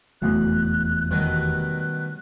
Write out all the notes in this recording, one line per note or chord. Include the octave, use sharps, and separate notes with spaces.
F1 E2 F#3 A3 F#6
B2 D#3 F#3 G3